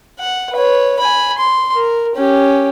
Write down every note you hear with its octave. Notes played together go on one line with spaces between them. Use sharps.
F#5
B4 C#5
G#5 B5
C6
A#4
C#4 G4